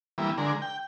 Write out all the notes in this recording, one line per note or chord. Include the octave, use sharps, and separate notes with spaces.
E3 G3 A#3 B3
D3 G#3 A#4
G5